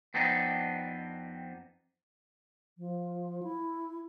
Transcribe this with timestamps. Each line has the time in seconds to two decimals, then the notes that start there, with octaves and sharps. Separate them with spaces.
0.14 F2 B3 C4 D4 D#4
2.78 F3
3.43 E4